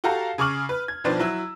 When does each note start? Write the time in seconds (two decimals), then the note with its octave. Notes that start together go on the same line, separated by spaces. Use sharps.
0.04 F#4 G4 A4 F5 A5 A#5
0.38 C#3 G#4 C#6 D6 F6 F#7
0.69 B4
0.88 G#6
1.04 B1 D#3 F3 D4 B4 C5
1.19 F#3 E4 E6